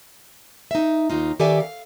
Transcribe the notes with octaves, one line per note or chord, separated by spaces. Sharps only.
D#4 E5
D#2 D#4 F4
D#3 G4 A4 D5 E5 G#5
F5